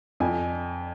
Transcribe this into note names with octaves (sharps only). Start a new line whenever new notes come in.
F2 G#5